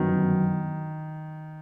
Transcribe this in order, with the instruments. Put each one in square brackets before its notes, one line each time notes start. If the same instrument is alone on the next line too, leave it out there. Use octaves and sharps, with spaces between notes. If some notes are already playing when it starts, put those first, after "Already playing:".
Already playing: [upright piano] G1 F#2 F#3 B3 [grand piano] D#3